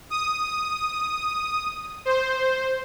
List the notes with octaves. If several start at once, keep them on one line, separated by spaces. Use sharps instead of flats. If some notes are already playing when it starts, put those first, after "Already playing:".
D#6
C5